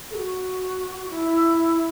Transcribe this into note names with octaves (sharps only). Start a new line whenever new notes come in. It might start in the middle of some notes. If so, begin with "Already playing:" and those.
A4
F#4
E4